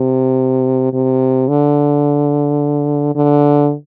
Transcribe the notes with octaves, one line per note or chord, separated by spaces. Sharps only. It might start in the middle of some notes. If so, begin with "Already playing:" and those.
Already playing: C3
C3
D3
D3